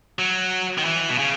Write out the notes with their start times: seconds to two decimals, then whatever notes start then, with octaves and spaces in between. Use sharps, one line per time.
0.19 F#3
0.78 D#3
0.85 E3
1.09 B2
1.19 C#3